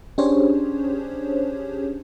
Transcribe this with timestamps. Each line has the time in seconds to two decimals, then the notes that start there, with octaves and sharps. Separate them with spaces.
0.18 C#4 D4 G4 G#4 C5 C#5